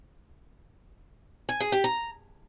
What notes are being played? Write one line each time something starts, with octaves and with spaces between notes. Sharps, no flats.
G#5
G#4
G4
A#5